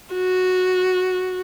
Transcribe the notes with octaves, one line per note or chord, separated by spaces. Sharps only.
F#4